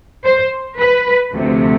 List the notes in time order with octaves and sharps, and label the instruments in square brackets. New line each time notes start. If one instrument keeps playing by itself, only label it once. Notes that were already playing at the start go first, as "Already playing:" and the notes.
[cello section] C5
B4
D2 C3 F3 A3